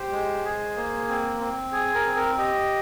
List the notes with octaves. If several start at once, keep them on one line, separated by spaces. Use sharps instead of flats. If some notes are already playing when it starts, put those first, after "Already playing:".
Already playing: G4 C5
G#3
G#4
A#3
C4
C4
G#4
A#4
C4
A#4
G4 D#5